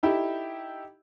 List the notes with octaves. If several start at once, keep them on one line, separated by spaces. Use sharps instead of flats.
D#4 E4 G4 A4 E5